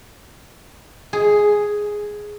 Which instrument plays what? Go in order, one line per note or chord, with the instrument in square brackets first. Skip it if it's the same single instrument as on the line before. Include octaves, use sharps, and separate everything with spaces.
[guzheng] G#4